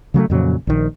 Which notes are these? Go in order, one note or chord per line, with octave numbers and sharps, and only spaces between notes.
C#3 F#3 G#3 A3
F2 A#2 C#3 F#3
A#1 D#3